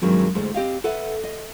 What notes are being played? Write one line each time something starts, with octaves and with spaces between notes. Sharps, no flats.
G2 D#3 F#3 G#3 C4
D2 A2 G#3 C5
C4 G4 D#5 F5
A4 B4 E5 F#5
D#5